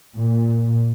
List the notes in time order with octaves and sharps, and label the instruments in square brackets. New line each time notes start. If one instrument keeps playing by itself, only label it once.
[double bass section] A#2